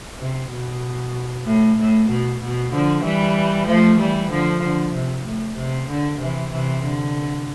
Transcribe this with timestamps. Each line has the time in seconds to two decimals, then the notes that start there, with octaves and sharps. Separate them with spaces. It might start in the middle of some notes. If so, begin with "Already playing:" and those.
0.19 C3
0.52 B2
1.46 A2
1.78 A2
2.09 B2
2.41 B2
2.72 D3 F3
3.03 E3 G3
3.67 F3 A3
3.99 E3 G3
4.30 D3 F3
4.61 D3
4.93 C3
5.25 A2
5.56 C3
5.88 D3
6.19 C3 E3
6.51 C3 E3
6.83 D3